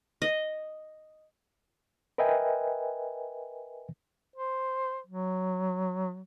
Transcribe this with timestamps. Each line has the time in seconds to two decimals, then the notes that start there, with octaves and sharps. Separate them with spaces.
0.22 D#5
2.18 A#4 B4 D#5 E5 G5 G#5
4.36 C5
5.06 F#3